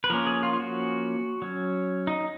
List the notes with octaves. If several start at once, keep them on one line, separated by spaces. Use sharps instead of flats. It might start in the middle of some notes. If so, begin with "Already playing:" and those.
B4
F3 A#3 C#4 A#4
G#4
F4
F4
F#4
F#3 C#4
D#4